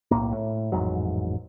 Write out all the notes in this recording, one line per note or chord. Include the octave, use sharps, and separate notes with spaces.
B1 E2 A2 A#3
A2
A1 F2 G#2 F#3